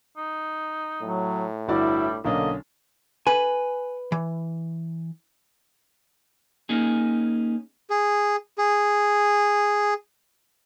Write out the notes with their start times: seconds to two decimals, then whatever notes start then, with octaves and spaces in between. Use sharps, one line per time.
0.17 D#4
1.02 A2 F#3
1.68 G1 G3 E4 F#4 D5
2.25 B1 D3 A#3 C#4 D4 D#5
3.27 B4 G#5
4.12 E3
6.69 A#3 C#4 D#4 G#4
7.90 G#4
8.58 G#4